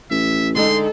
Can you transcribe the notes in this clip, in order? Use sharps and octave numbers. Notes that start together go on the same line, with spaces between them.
A1 E5
D3 G#3 D#4 A4 C6